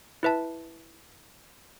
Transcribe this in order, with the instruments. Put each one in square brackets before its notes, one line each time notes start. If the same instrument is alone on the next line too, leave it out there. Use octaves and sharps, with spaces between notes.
[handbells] E4 B4 E5 A5